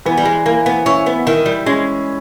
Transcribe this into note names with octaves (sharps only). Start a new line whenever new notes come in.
E3 B3
G3
G#3
E3 A#3
B3
C#4 E4
B3
D#3 E4
G3
G#3 C#4